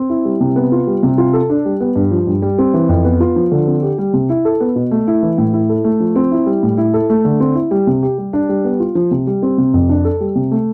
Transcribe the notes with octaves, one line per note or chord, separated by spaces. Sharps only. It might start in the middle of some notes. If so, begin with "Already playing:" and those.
Already playing: C4
E4
G3
C3
B3
F4
G3
C3
F4
A4
D4
G3
B3
G2
F3
G2
G3
C4
E3
F2
B3
F4
F3
D3
C4
G4
G3
C3
E4
A4
B3
B2
A3
E4
E3
A2
E4
A4
A3
F3
C4
E4
G3
A2
E4
A4
A3
D3
C4
E4
G3
C3
G4
G3
D4
G3
B3
F4
F3
C3
G3
C4
C3
F2
D4
A4
G3
C3
A3